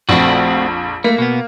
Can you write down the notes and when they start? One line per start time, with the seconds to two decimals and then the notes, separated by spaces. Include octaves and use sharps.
0.09 A#1 F2 A3 C4 F#4
1.04 A3 A#3
1.18 B2 B3